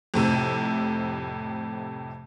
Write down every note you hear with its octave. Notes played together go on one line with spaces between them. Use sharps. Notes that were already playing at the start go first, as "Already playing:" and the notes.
F2 A2 C3